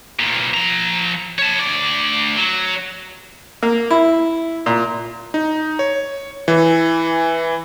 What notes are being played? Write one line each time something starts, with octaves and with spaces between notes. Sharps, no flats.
B1 A#2
F3 A#5
C#5 A5
D2 D5
F#3
A#3
E4
A#2
D#4
C#5
E3